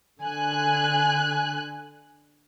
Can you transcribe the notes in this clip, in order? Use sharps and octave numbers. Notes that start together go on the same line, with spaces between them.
D3 G#5 F#6